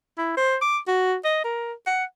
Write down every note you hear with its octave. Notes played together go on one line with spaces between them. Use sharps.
E4
C5
D6
F#4
D#5
A#4
F#5